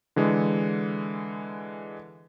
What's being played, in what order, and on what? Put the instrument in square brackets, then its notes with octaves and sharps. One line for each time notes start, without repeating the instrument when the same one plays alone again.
[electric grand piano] D3 E3 G#3